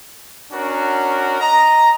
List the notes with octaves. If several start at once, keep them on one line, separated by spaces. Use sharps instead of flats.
C#4 D4 F#4 A#4
D#5 A#5